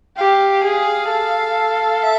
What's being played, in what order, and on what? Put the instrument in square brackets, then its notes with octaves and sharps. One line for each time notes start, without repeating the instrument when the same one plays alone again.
[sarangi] G4 [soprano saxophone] F5
[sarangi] G#4
A4
[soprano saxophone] E5